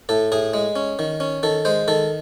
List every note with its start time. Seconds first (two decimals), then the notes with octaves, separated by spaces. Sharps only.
0.09 A2 A4
0.32 A2 G#4
0.54 G#3
0.76 C#4
0.99 D#3
1.20 C#4
1.43 D#3 A4
1.65 G#3 C5
1.88 D#3 A4